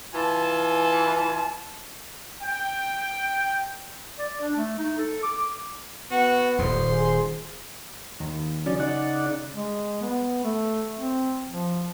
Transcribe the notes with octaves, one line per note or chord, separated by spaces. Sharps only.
E3 F4 G#5 A5
G5
D5
D4
A3
D#4
A4
D6
B3 F#4 F#5
D#1 D#2 C5 C6
G#4
D#2
C#3 F#3 D5
D#4 D5 F#5
G#3
B3
A3
C4
F3